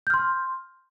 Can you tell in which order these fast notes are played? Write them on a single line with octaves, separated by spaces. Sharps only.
G6 F6 C6